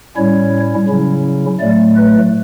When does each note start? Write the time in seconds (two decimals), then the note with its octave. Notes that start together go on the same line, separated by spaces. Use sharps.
0.16 A2 G3 C#4 E4 C#5
0.88 C#3 F#3 C#4 E4
1.60 A2 F#3 A3 D5
1.96 B4